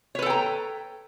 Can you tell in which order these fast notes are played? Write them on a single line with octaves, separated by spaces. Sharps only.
C#5 B4 A4 G5 A#5